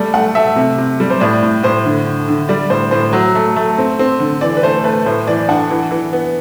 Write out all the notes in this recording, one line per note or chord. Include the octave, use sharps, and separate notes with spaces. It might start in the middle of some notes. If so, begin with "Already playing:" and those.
Already playing: G3 A3 D5
A3 F#5
A3 E5
C3
C3
G3
C5
A2 D5
A2
A2 C5
D3
D3
D3
G3 D5
A2 C5
A2 C5
F#3
A3
A3
C4
C4
D3
E3 D5
B4
A3 C5
A3 B4
A2 C5
E3 D5
D4 F#5
E3
E3
B3